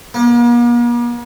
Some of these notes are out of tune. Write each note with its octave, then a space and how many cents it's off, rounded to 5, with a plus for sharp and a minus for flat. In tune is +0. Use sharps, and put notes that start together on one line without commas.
A#3 +45